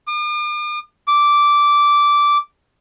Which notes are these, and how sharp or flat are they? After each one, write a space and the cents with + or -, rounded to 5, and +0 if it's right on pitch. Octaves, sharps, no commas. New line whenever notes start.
D6 +45
D6 -10